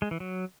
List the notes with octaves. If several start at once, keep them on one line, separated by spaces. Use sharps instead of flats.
G#3
E3
F#3